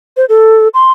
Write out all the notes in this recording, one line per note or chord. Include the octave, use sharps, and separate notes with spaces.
C5
A4
C6